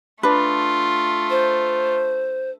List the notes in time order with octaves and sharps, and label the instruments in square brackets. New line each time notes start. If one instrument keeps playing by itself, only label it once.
[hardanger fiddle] A3 F4 [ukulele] D4 B4
[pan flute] C5